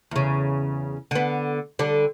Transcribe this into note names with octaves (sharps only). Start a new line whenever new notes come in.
E2 C#3
D3 B3
D3 G3 D4